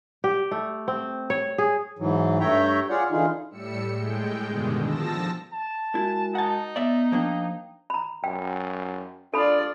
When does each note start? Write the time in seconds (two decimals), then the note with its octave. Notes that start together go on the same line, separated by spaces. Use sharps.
0.24 G4
0.51 A3
0.88 C4
1.30 C#5
1.58 G#4
1.99 G#2 E3 F#3
2.40 G2 A3 C#5 E5 G5 A#5
2.90 F4 G#4 C#5 D5 F#5
3.11 D3 E3 D#4 F4 G#4
3.51 A2 G3 E6 C#7
3.92 A2 G#3 G5
4.46 G2 B2 D3 D#3 G#3
4.82 F3 A5 E6 A#6
5.53 A5
5.95 G#3 E4 F#4 A#4
6.35 D#4 F#5 A5
6.76 B3 D5 E5
7.12 F3 A#3 D4 F5 G5
7.90 A#5 B5
8.24 F#2 G5
9.34 D4 F4 A4 D5 B5